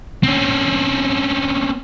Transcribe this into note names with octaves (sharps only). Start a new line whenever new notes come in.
C4 C#4